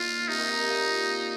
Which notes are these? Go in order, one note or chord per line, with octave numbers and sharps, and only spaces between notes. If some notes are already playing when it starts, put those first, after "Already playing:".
Already playing: A#2 D#3 F4
C3 D#4
D#3
C3
D#3
A#2